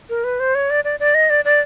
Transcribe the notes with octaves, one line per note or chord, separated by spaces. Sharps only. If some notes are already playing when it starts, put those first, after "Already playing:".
A#4
B4
C5
C#5
D5
D5
D5
D#5
D5
D5